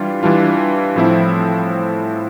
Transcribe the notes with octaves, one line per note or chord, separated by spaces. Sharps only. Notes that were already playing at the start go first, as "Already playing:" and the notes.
Already playing: E3 G3 D4 F4
E3 G3 D4 F4
A2 F3 C4 E4